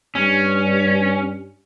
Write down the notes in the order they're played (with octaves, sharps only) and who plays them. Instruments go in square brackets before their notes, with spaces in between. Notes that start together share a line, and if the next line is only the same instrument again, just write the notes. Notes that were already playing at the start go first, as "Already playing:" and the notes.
[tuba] G2 [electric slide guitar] C#4